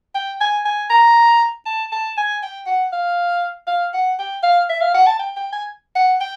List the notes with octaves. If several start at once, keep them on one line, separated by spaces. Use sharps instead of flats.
G5
G#5
G#5
A#5
A5
A5
G#5
G5
F#5
F5
F5
F#5
G5
F5
E5
F5
F#5
A5
G5
G5
G#5
F#5
G5